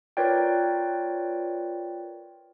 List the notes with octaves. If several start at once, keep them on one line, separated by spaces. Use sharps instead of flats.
F4 A#4 B4 C#5 D5 G5